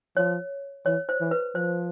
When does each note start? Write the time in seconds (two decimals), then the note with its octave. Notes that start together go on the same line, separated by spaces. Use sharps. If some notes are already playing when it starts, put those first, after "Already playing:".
0.16 F3 C#5
0.85 E3 C#5
1.09 C5
1.20 E3
1.31 B4
1.55 F3 C5